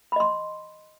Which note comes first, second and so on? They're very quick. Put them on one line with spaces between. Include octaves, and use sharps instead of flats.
B5 D#5 C6